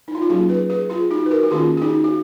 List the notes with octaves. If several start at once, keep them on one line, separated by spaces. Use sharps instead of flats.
D#4
F4
F#4
F#3 A#3 C#4 F4 G#4
G#4 B4
G#4 B4
F4 G#4
D#4 F#4
B4
F#4 A#4
F#4
D#3 A#3 C#4 F4 G#4
G#4
D#4 F#4
F#4